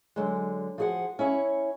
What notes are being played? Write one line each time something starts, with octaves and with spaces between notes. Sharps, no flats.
D3 F#3 G#3
F3 F#4 G#4 C5 F#5
C#4 E4 C#5